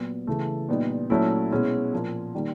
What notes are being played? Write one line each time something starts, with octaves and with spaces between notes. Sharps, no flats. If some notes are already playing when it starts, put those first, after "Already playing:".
Already playing: A#2 F#3 B3
C#3 E3 A3
A#2 G3 B3 D#4
A#2 F#3 A3 C#4 E4
B2 G#3 C#4 E4
A#2 F3 A#3
D#3 G3 A#3